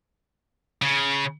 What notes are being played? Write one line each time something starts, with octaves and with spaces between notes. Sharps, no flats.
C#3